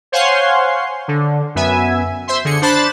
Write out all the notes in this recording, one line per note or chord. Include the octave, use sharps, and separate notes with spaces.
C5 C#5 F5 F#5 G#5 C6
D3
F#2 B3 E5 G#5
C5 E5 C6
D3 G#4 C#7
D4 C5 A5 B5 F#6 A6